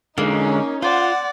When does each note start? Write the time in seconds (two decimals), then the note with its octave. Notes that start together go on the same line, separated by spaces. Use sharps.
0.18 D3 G#3 A#3 C#4 D#4
0.82 F4 C5 D5 F#5